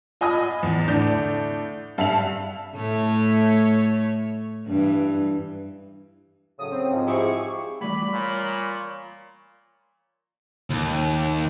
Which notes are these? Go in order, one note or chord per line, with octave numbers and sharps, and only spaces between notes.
F4 D#5 G#5 B5 D#6
E2
A2 D3 D5 G6
G2 E5 F5 A5 F7
A2 A3 C#5
G2 E3
A2 C#3 F#3 D#6
C4
G#2 F3
E4 G4 G#4 C#6
E3 G3 A3 D5 B5
A#2 C#5
D#2